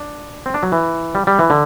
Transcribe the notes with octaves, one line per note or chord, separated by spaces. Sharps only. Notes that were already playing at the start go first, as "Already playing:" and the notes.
Already playing: D4
C4
D4
F#3
E3
G3
G3
E3
D3